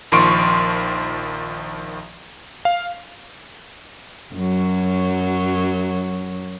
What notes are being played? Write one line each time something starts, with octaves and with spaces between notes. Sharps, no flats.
A#1 D#3 F3 C6 C#6 D7
F5
F#2 F#3